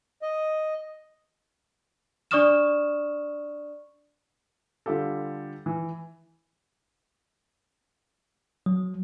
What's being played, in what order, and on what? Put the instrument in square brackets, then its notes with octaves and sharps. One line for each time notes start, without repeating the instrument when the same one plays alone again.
[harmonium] D#5
[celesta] D4 D5 C#6 D#6 F6 E7
[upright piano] D3 G3 F4 G4 A4
E3
[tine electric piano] F#3